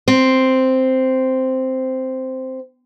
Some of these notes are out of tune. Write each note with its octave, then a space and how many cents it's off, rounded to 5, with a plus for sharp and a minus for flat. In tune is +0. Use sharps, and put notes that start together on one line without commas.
C4 -5